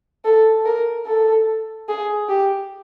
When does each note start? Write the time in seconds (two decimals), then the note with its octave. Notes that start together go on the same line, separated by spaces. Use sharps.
0.25 A4
0.66 A#4
1.06 A4
1.89 G#4
2.29 G4